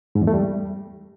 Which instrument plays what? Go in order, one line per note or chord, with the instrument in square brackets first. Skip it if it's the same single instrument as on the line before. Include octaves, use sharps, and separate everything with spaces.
[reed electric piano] G#2
E2
A3
G3